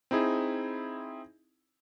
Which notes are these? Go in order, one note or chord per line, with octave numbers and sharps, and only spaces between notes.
C4 D#4 E4 G#4